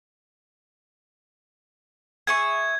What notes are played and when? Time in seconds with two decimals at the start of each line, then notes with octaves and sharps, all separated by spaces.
2.27 G#4 E5 C#6 G#6